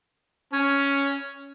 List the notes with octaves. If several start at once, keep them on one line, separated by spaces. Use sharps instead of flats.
C#4